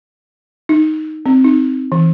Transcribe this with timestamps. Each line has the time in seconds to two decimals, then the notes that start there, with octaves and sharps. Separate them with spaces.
0.69 D#4
1.26 C4
1.44 D#4
1.92 E3